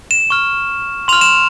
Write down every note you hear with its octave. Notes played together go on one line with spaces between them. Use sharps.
E7
C#6 F6
C6 F6 F7
E7